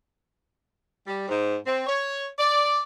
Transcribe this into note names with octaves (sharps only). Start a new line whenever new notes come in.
G3
G#2
C4
C#5
D5